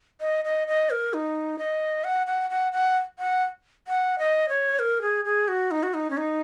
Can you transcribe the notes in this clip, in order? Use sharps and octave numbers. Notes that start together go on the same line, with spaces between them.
D#5
D#5
D#5
A#4
D#4
D#5
F#5
F#5
F#5
F#5
F#5
F#5
D#5
C#5
A#4
G#4
G#4
F#4
D#4
F#4
D#4
C#4
D#4